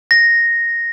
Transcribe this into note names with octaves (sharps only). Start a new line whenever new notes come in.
A#6